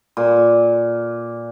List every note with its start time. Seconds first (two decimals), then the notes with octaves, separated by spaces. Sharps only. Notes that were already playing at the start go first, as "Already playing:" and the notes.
0.17 A#2